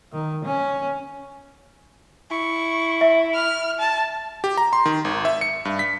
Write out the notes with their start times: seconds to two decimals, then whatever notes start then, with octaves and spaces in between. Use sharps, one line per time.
0.13 D#3
0.45 C#4
2.31 E4 C#6
3.01 E5
3.34 F6
3.80 A5
4.44 G4
4.57 A#5
4.73 C6
4.86 D#3
5.05 G#1
5.25 E5
5.41 C#7
5.65 G2
5.79 B6